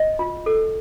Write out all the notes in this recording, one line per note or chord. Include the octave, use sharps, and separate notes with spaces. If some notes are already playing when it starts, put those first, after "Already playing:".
Already playing: D#5
F4
A4